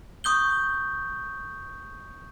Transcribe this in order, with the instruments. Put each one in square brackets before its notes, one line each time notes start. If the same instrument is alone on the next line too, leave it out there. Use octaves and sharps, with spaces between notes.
[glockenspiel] C#6 D#6 G6 G7